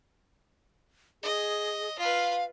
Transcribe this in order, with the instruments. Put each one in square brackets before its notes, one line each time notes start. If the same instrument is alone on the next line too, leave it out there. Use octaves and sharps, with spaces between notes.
[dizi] G#4 [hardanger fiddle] D#5
[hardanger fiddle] F4 B4 [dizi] F5